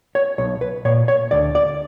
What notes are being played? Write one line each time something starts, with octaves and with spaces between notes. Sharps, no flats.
C#5
B1 C#5
B4
A#2 C#5
C#5
D2 D5
D5